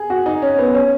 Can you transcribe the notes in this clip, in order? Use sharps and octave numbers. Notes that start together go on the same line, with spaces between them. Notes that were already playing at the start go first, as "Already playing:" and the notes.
Already playing: G#4
F#4
D#4
C#4
B3
C#4